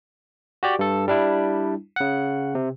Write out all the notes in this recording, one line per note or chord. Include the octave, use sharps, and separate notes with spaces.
F#4 G4 D5
G2 A4
G3 D4 E4
C#3 F#5
C3